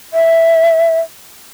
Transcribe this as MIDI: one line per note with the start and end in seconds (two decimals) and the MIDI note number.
0.14 1.00 76